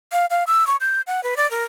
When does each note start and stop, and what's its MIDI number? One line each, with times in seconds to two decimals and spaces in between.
0.12 0.26 77
0.30 0.44 77
0.47 0.67 88
0.67 0.76 85
0.81 1.01 91
1.07 1.23 78
1.23 1.35 71
1.37 1.50 74
1.51 1.64 70